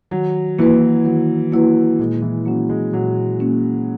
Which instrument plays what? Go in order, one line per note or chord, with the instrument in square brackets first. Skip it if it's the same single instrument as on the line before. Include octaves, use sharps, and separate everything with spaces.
[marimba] D#3 [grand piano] F#3
[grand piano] E3 [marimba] A#3 E4 B4
[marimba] D#3 [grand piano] F#3
[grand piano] F#3 [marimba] A#3 E4 B4
[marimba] A#2 [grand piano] G#3
[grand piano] E3
[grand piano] F#3 [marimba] A#3 C#4
[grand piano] G#3
[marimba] A#2 [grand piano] F#3
[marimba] A#3 C#4